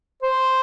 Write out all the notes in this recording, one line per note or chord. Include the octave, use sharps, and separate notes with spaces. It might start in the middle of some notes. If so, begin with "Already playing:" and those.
C5